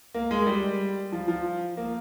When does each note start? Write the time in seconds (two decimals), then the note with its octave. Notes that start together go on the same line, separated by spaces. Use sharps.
0.14 A#3
0.31 G#3
0.46 G3
1.12 F3
1.28 F3
1.77 A#3